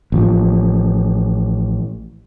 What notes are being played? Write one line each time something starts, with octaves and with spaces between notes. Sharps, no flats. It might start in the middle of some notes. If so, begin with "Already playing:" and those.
A1 F3